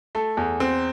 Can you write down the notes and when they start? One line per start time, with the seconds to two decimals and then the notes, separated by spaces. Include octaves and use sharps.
0.15 A3 A4
0.37 E2
0.60 C4